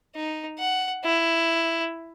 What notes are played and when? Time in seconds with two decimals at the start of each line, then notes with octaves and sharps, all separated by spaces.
0.15 D#4
0.59 F#5
1.04 E4